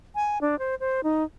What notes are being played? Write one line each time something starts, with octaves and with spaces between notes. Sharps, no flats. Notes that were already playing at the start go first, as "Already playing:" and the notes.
G#5
D4
C5
C5
D#4